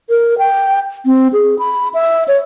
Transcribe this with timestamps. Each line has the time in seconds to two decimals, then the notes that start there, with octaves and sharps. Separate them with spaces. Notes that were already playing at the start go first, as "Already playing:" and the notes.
0.10 A#4
0.38 G5
1.06 C4
1.33 G#4
1.59 B5
1.94 E5
2.28 C#5